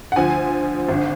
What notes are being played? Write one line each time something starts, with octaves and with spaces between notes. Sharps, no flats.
F#5
D2 D3 F3 G#5
G#1 D3